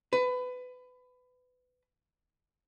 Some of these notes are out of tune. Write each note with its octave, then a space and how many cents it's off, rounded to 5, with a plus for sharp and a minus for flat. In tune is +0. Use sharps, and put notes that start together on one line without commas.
B4 +25